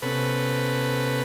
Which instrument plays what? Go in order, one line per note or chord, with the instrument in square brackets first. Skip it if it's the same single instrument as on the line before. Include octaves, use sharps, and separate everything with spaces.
[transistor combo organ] C3 B3 C#4 A4 B4